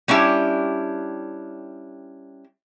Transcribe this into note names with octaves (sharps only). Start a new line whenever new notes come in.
G3 C#4 D4 E4 G4